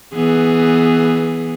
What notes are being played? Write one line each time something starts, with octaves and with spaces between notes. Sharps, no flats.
E3 B3 G#4